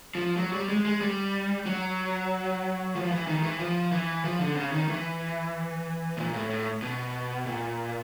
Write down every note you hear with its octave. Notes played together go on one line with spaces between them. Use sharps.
F3
F#3
G3
G#3
G#3
G3
F#3
F3
E3
D#3
E3
F3
E3
F3
D3
C#3
D#3
E3
A#2
A2
A2
B2
A#2